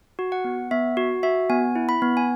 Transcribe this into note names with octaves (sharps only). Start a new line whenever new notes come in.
F#4
F#5
B3
B3 E5
F#4
F#4 E5
B3 G#5
E4
B5
B3
G#5